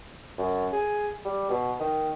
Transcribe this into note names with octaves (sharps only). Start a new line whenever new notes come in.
F#2
G#4
G3
B2
D#3